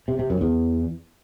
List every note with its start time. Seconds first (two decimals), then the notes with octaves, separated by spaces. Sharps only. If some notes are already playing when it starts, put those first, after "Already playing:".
0.08 C3
0.19 C3
0.30 F#2
0.41 E2